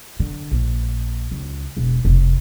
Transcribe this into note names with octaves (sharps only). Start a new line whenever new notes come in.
D3
A#1
C#2
E1
F1 C3